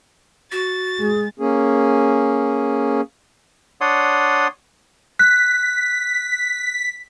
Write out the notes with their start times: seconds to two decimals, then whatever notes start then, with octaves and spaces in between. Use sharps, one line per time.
0.52 F#4 A6
0.99 G#3 G#4
1.39 A#3 C#4 G#4
3.81 D4 C#5 D5 F#5 C6 D#6
5.19 F#6 B6